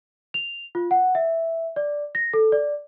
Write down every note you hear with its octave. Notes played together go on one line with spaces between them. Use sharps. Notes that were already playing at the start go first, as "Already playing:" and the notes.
F7
F4
F#5
E5
D5
A#6
A4
D5